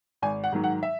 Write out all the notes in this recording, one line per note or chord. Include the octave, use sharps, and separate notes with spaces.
G#1 G#5
F#5
G#2 D#3 F#3
F#5
E5